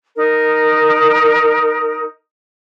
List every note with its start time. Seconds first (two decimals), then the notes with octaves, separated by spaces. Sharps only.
0.16 D#4 A#4